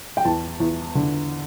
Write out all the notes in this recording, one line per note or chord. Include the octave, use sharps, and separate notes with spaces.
G5
E2 A5
E2
D3